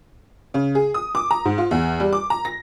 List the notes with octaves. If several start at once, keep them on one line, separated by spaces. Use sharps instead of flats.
C#3
G#4
D#6
D6
A#5
G#2
F4
E2
G3
D6
A#5
A#6